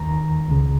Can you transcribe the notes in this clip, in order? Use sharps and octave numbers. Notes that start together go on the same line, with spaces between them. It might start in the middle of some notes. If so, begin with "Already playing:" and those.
Already playing: D#2 D#3 A#5
C#2 C#3